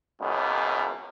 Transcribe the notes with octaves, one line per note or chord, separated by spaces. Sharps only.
G#1 C#2 F#2 B2